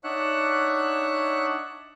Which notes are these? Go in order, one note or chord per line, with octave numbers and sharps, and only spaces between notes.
D4 D#4 C#5 E5 F#5 F#6